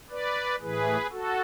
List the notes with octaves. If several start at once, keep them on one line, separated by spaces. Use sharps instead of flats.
B4 D5
A2 E3 G#4 B4
F#4 A4